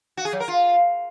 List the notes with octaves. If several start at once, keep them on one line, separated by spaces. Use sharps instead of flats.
F#4
G#4
F#3
A#4
F4